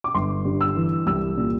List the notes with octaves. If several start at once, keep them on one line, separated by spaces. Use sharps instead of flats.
D6
G1 C6
G2
E6
E3
C2 E6
A#2